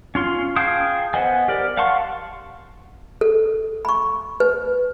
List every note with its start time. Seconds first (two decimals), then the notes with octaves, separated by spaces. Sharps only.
0.15 C#4 F4 C6
0.56 G#4 F5 G5 A5 D#6
1.14 B3 C5 D#5 F#5 G#5
1.48 G4 A#4 D5
1.77 F5 F#5 A5 C6 C#6
3.21 A4
3.85 B5 C#6
4.40 B4